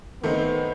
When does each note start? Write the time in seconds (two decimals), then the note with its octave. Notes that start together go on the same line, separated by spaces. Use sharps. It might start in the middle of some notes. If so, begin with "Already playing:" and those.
0.23 D#3 A3 B3 C4 D#4